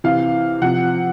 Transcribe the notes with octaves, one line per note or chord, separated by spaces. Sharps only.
C3 E3 F5
C3 F3 F#5